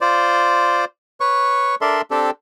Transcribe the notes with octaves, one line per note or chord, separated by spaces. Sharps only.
F4 C5 D5
B4 C#5 C#6
D4 A4 A#4 D5 E5 C6
C4 D4 G4 A4